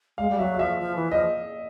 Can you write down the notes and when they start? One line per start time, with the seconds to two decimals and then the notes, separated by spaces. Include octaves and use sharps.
0.18 G#3 F5
0.30 G3
0.39 F#3 E5
0.55 F5
0.59 F3 E5
0.80 F3
0.96 E3
1.11 F3 D#5